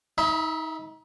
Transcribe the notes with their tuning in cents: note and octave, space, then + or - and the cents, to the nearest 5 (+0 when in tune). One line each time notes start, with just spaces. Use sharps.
D#4 +30 E5 +0 B5 -30